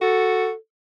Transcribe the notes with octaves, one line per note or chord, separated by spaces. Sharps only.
F#4 A4